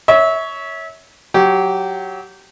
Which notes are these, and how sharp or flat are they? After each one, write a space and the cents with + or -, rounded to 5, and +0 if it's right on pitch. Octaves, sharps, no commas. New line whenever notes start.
C#5 +10 E5 -25
F#3 +0 G4 -20